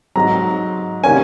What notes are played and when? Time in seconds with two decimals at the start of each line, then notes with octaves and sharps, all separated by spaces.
0.16 G#2 F#3 C4 A#5
1.04 C3 D#3 A#3 C#4 G#5